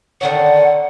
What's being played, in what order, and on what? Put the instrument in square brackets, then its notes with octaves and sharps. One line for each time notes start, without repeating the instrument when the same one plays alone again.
[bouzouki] D3 D#3 C#4 [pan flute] F#5